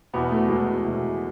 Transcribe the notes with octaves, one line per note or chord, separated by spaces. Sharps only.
E2 B2 B3
A3
E2 B2 G#3
E2 B2